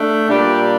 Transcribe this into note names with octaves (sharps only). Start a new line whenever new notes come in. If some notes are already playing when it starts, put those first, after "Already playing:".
Already playing: A3 D4
A#2 G3 D4 G4